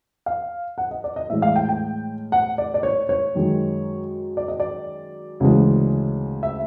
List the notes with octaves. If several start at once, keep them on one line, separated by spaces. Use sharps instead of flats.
F5
F#5
D#5
D5
D#5
A2 E3 G#3 E5
F5
G5
G5
F#5
D5
D5
C#5
C#5
F#2 D#3 G#3
D5
D#5
D5
D2 C#3 E3 G#3
E5